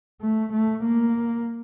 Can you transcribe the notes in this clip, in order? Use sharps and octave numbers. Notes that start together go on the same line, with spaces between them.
A3
A3
A#3